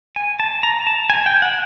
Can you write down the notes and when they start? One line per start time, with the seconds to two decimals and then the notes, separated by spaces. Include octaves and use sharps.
0.16 G#5
0.40 A5
0.63 A#5
0.87 A5
1.10 G#5
1.26 G5
1.42 F#5